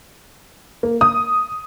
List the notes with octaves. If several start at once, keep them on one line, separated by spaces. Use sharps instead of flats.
A#3
D#6